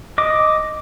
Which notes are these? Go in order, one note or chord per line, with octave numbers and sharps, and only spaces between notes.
D#5 D6